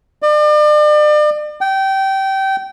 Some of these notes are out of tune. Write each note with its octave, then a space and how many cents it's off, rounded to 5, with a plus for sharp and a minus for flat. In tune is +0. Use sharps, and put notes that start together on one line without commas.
D5 +40
G5 -20